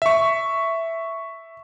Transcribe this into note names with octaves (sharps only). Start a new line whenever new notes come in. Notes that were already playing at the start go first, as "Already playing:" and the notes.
E5 C#6